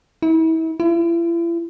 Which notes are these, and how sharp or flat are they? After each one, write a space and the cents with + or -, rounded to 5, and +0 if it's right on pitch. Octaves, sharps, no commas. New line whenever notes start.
E4 -35
E4 +40